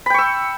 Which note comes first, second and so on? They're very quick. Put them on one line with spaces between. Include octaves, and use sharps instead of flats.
B5 G5 C#6 E6